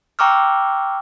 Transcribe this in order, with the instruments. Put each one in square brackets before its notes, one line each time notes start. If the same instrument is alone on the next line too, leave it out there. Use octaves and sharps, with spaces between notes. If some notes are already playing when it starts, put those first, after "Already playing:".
[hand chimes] G5 A#5 C#6 D6 E6 F6